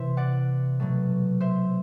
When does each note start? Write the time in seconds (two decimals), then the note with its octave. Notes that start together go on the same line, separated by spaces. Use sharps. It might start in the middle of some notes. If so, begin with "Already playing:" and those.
Already playing: C3 E3 C5 E5
0.17 D5 F#5
0.80 B2 F#3 A3
1.40 C5 E5